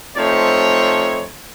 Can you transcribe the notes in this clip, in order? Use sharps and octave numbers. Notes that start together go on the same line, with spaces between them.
F3 A3 C4 D#4 C5 C#5